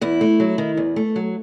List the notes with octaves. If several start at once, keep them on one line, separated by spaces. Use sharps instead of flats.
E2 E4
A3
F#3
D#3
E2
A3
F#3